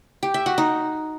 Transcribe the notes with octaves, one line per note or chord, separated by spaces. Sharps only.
G4
E5
F#4
D#4